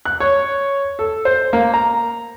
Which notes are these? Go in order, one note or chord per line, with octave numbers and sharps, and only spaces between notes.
F#6
C#5
A4
C5
A#3
A#5